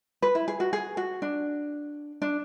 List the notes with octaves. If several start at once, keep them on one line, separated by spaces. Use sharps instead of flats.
B4
E4
G#4
F#4
G#4
F#4
D4
D4